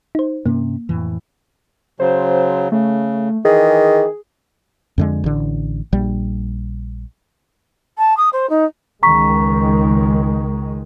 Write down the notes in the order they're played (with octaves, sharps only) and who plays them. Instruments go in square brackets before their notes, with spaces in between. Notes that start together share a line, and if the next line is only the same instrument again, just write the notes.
[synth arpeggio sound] D#4 C5
[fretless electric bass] G2 C3 C#4 [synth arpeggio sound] A#3
[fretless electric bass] F2 A2 E3
[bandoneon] C#3 F#3 [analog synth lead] C5
[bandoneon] C#3 [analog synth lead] A3
[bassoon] D#3 [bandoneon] E3 [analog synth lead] G#4
[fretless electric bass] F2 D3 G#3
A1 D3
A#1 G3
[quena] A5
D#6
C5
D#4
[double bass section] C#2 D#3 G#3 [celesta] A#5 C#6 B6